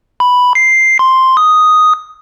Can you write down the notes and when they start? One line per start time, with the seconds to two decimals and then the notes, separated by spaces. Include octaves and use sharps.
0.20 B5
0.55 C7
0.99 C6
1.37 D#6